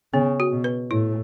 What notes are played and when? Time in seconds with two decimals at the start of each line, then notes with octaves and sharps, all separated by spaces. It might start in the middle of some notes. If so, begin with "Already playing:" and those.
0.13 C#3 B3
0.40 F#4
0.52 B2
0.64 B4
0.91 A2 E4